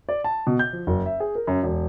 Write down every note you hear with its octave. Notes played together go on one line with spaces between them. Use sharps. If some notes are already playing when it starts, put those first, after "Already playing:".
D5
A5
B2
G6
F3
F#1
E5
G#4
A#4
F#2
E1